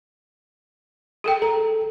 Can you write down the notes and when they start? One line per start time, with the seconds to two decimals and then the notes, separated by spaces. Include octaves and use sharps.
1.24 G#4 A4 G5
1.42 A4 A#5